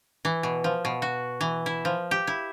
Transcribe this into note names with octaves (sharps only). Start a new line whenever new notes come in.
E3
B2
F3
B2
F#4
E3
E4
F3
G4
E4